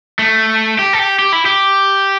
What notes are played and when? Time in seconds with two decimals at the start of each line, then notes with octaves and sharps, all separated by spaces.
0.19 A3
0.79 G4
0.93 A4
0.99 G4
1.19 G4
1.32 E4
1.46 G4